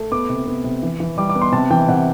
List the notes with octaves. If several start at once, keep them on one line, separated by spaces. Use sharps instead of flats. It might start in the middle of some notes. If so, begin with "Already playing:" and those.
Already playing: A3
B3 D6
C3
B3
C3
E3
E3
G3 D6
D6
B3
C6
C3 A5
E3 G5
C3 F#5